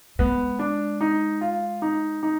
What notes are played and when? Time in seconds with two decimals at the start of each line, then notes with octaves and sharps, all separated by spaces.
0.19 G#3 B3
0.59 D4
1.01 D#4
1.41 F4
1.82 D#4
2.23 D#4